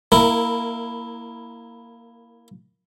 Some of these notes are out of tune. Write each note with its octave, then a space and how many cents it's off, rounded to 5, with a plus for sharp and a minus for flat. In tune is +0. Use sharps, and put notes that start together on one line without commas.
A#3 +0 E4 +0 A#4 -25